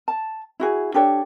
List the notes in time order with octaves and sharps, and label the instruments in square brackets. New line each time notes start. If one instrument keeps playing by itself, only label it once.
[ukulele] A5
E4 F#4 G#4
D4 G4 A4 C#5